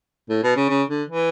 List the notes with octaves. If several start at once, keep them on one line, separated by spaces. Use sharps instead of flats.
A2
B2
C#3
C#3
D3
E3